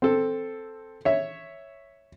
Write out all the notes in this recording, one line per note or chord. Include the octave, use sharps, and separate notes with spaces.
C4 A4
C#5 E5